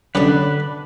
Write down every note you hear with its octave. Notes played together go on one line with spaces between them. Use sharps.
F#2 D3 B3 D4 G4 B4